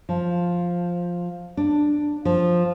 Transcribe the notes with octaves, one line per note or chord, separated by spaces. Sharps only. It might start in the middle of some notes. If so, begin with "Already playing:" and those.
F3
D4
F3